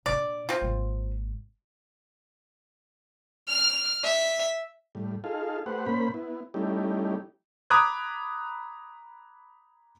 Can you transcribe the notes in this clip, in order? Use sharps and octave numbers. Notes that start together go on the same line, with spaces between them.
A#2 D4 D5
C4 F4
G#1 A#2
F6
E5
A2 G3
D#4 F4 G#4 A4 F5
A3 G4 B4 C5 F#5
A#2 A#3 C#4 C5 B5
B3 E4
G3 A3 C#4 D#4 E4 G4
A#5 B5 D6 D#6 F#6 G#6